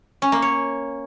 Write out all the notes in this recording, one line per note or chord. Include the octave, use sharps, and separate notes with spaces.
C#4
A#3
C#5